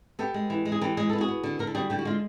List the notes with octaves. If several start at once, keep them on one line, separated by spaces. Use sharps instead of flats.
B3 G4 A4
G#3
E3
G#3
G#4
E3 G4 A4
G#3 G#4
B3 A4
F#4 G#4
B3
D3
D3 A#4
A4
G3 F#4 G#4
D3 G4
F#4
G#3 F4